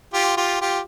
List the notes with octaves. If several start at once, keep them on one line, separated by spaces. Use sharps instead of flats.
F4 G4
F4 G4
F4 G4